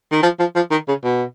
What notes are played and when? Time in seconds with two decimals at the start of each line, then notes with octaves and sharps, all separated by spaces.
0.12 D#3
0.23 F3
0.39 F3
0.56 F3
0.71 D#3
0.88 C#3
1.04 B2